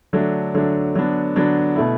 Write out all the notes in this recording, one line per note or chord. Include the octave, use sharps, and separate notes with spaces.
D3 F#3 A3 D4
D3 F#3 A3 D4
D3 F#3 B3 D4
D3 F#3 B3 D4
B2 A3 E4